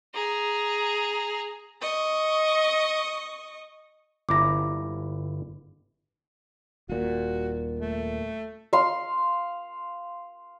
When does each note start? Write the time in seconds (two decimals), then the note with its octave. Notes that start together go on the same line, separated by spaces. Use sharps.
0.14 G#4 A#5
1.81 D#5 C#6
4.29 G1 E4 A#5 D6 A#6
6.89 D#1 A#2 F#4
7.79 A3
8.73 F5 C6